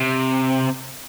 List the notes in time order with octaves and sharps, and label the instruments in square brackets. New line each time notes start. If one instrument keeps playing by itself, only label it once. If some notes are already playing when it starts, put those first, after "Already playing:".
Already playing: [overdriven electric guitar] C3